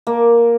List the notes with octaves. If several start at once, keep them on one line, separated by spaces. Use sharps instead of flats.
A#3